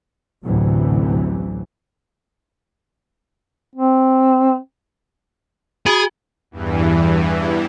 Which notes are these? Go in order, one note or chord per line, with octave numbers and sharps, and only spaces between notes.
A1 D2 A2 C3 E3 F#3
C4
F#4 G#4
E2 G2 E3